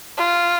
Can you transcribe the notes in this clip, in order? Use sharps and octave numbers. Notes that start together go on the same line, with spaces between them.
F4